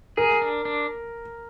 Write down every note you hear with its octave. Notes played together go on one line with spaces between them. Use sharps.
G#4 A#4
D4
D4